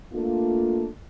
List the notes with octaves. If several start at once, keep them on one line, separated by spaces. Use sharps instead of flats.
A3 A#3 D4 F4